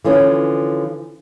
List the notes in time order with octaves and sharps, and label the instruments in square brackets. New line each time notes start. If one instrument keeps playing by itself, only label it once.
[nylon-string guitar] D3 E3 F3 C#4